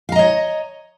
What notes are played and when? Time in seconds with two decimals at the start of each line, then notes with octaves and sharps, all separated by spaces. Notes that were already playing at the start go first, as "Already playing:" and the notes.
0.09 F5
0.12 A#5
0.16 D#5
0.19 C#5